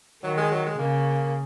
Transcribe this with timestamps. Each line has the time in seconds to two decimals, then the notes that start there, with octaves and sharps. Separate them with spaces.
0.23 D#3 F#3
0.37 G#3
0.51 F#3
0.66 G#3
0.79 C#3 A#3